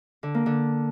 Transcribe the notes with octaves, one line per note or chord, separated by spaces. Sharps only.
D3
A#3
D3